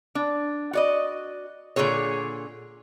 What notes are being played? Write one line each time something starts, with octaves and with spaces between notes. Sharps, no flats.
D4
F#4 D5 D#5
A#2 D3 F#3 G#4 C#5